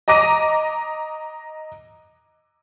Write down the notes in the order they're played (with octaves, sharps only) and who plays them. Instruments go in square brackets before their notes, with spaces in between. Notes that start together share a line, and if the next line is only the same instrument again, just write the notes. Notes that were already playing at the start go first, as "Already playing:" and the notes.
[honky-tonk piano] D#5 A#5 D6 A#6 D#7